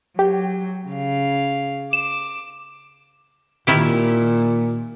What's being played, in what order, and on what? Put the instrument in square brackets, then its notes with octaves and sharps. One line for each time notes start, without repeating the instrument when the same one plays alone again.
[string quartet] F#3 [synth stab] G4
[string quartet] C#3 F5
[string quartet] D6 [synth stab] E7
[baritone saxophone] A#2 [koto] D#3 E4 G4